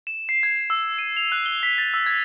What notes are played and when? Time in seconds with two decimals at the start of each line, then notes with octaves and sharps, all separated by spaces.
0.07 E7
0.29 C7
0.43 G#6
0.70 E6
0.99 D#7
1.17 F7
1.32 F#6
1.46 G7
1.63 B6
1.78 A6
1.94 E6
2.06 G#6